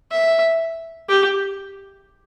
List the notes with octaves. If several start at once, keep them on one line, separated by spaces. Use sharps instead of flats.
E5
G4